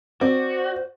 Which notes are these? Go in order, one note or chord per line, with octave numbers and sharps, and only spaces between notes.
C4 F#4 C5 D5